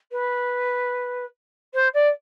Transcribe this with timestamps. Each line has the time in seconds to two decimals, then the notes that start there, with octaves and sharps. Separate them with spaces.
0.12 B4
1.74 C5
1.94 D5